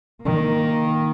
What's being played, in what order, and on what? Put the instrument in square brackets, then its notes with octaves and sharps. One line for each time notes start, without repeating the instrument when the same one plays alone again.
[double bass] D#3 A#3